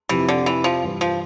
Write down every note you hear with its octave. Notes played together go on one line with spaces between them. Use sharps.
F2 C3 E3 F3 C4 G4
D3
E3
F3
G2 E3 G3
F3